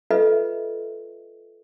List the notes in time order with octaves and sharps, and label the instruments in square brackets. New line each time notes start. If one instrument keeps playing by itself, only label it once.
[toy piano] F4 A4 B4 D#5 E5